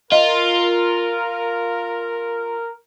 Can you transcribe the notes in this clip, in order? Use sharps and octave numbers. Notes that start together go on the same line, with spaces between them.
F4 A#4 D#5